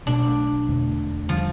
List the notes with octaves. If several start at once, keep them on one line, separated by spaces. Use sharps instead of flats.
B1 B2 A3 D4
E1 E2 D3 A3
D3 F3 G3